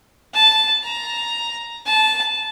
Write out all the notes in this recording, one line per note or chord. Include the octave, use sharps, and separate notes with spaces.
A5
A#5
A5